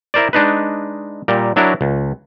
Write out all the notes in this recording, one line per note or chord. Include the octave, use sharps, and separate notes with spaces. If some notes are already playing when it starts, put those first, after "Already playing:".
E4 A#4 C5 D5
G#3 D4 D#4 B4
A#2 G3 A#4
F#3 D4 E4 A#4 C#5
C#2